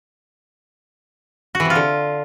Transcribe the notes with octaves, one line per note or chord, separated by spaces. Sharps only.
F#4
E3
C3
F4
D3